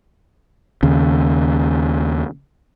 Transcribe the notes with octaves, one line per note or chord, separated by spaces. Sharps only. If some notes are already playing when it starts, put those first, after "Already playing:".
D#2 C#3